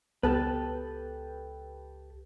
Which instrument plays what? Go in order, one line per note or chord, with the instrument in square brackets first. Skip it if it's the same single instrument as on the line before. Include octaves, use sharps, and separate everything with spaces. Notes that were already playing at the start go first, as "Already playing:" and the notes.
[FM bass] C#2 [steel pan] B3 A5 [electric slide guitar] G4 A4 B4